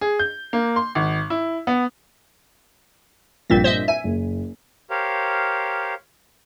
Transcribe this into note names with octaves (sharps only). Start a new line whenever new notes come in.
G#4
G6
A#3
C6
G#1
E4
B3
A#1 G2 A#2 C4 A6 B6
C5 D#5 E5
E5 G#5
F#1
G4 A#4 C5 C#5 F5